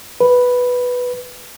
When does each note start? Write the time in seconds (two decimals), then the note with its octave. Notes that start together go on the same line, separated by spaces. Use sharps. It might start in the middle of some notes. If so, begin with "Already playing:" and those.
0.20 B4